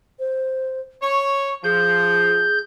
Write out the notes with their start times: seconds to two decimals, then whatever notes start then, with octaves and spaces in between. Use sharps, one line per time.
0.19 C5
1.02 C#5 C#6
1.64 F3 G#4 G6